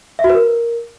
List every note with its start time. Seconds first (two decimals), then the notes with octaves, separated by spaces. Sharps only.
0.19 E5
0.24 F#4
0.30 B4
0.35 A#4